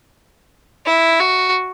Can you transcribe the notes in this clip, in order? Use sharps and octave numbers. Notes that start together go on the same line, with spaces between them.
E4
F#4